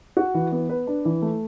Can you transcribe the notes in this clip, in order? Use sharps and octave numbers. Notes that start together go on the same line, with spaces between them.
F#4
E3
B3
B4
D4
E3
A3